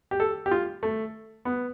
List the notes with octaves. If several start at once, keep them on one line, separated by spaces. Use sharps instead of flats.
G4
A4
G4
F4
A3
B3